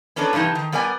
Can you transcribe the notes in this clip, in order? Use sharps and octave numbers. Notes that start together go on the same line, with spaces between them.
B3 C#4 D4 A4 A#4
G2 C3 E3 D#4 A5
D#3
G3 B3 A#4 D5 G#5